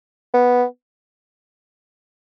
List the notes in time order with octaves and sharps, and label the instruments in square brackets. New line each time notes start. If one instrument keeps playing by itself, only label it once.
[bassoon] B3